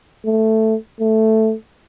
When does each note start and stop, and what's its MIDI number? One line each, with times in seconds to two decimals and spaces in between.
0.25 0.75 57
1.00 1.53 57